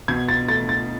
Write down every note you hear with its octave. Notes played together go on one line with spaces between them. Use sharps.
B2 G#6
A6
A3 A6
A6